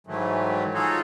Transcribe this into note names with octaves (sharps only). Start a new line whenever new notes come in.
G#2 D#3 E3 F#3 A3
D#4 F4 F#4 G#4 A4 C#5